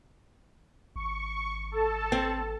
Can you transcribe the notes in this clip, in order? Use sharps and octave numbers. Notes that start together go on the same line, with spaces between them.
G#1 C#6
A4 A5
C4